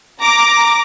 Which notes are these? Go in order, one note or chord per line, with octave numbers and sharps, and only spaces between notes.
A#5 D6